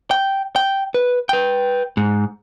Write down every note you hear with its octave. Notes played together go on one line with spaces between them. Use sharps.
G5
G5
B4
B4 G5
G#2